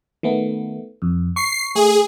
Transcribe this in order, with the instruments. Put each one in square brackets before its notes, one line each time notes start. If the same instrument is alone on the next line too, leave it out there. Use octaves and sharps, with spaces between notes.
[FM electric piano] D#3 A3 B3
F2
[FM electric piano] C#6 [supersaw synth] C7
[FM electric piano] A3 [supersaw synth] G#4